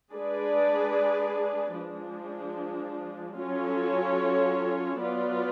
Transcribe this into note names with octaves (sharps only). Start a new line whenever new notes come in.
G#3 D4 G#4 B4 D5
F3 G#3 D4
F#3 C#4 F4 A4 C#5
F#3 B3 F4 B4 D5